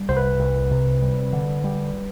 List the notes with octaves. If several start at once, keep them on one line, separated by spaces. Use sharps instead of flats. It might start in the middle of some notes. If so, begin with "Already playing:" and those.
Already playing: G3
C2 C5
B4
C2
C3
G3
D3
G3